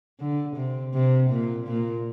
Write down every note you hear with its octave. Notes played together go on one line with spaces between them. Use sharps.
D3
C3
C3
A#2
A#2